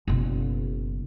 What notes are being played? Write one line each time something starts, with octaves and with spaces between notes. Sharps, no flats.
F#1 B2